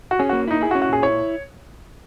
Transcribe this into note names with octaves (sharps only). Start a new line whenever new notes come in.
F#4
C#4 G#4
A#3 F#4
D#4 E4
E4 G#4
F#4
C#4
F#4
A#2 G#4
E4 C#5